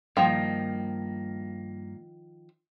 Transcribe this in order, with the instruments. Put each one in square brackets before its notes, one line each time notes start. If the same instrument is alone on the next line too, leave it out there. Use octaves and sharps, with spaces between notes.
[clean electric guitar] G2 A#3 [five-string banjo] D#3 F3